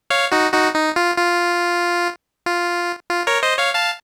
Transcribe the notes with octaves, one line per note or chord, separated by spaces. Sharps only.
C#5 F5
D#4 F#4
D#4 F#4
D#4
F4
F4
F4
F4
A#4 C#5
C5 D#5
C#5 F5
F5 A5